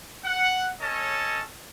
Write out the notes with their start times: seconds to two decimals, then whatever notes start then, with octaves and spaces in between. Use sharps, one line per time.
0.25 F#5
0.80 C#4 A4 C#5 D#5 A5